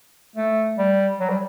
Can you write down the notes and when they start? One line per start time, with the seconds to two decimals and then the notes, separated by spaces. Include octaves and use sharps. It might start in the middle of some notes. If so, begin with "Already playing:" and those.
0.36 A3
0.78 G3
1.20 F#3
1.29 G3